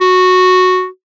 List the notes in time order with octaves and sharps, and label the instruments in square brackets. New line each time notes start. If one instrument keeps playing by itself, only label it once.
[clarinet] F#4